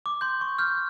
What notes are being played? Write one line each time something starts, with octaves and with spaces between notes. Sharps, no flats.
D6
C6 G6
C#6
F6 G6